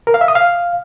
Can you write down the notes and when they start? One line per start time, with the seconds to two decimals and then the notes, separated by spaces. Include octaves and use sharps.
0.07 A#4
0.14 F5
0.21 E5
0.28 D#6
0.35 F5